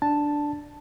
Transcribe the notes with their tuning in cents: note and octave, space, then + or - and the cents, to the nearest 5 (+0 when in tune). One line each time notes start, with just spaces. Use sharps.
D4 +0 A5 +0